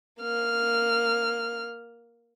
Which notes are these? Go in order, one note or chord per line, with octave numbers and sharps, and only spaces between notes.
A#3 F6